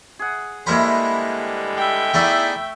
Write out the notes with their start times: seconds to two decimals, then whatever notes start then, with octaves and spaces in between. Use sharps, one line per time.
0.19 G#4 F#5
0.67 D3 G3 G#3 A#3 E4 A#4 C5 B5
1.77 E5 G5
2.14 A3 B3 D#4 E4 G#4 A4 D5